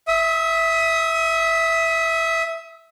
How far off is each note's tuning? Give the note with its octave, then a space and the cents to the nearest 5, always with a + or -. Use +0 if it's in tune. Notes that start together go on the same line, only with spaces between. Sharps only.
E5 +0 D#6 +35